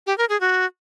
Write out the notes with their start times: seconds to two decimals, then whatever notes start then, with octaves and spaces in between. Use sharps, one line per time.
0.07 G4
0.18 A#4
0.29 G#4
0.40 F#4